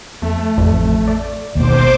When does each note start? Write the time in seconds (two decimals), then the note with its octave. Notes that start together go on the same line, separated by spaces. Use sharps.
0.22 F2 A3
0.57 A1 F2
1.08 D5
1.55 G#1 D#2 B2 C5 D6